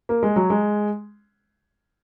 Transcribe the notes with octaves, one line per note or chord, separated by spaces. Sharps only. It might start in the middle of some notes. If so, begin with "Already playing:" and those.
A#3
G#3
F#3
G#3